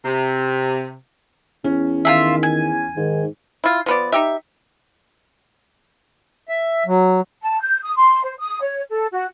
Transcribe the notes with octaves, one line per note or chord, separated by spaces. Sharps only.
C3
E2 C#4
D#3 F4 G#4 E5
G#5
G#2 D#3
E4 F4
F3 B3 D5
D#4 G4 E5
E5
F#3
A5
G6
D#6
C6
C5
D#6
C#5
A4
F#4